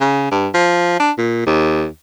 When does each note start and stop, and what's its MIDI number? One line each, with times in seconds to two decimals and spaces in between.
0.01 0.27 49
0.31 0.48 43
0.54 0.95 53
1.00 1.11 62
1.18 1.44 46
1.46 1.86 39